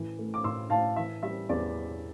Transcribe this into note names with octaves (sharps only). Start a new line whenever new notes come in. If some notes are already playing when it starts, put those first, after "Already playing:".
Already playing: A2 E3
A3
D6
A2 C6 E6
A2 F5 A5
E3 E5
G3 E5
E2 D5